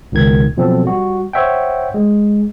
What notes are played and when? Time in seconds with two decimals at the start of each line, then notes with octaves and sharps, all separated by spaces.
0.12 C#2 B2 D#3 G#6
0.57 B2 F3 F#3 C4 A4
0.83 G3 F#4
1.33 C5 C#5 E5 F#5 G5
1.94 G#3